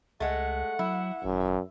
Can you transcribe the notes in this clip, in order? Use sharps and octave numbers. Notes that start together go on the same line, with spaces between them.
C#2 G#3 A3 F#5
F#3 E4
G#1 F#2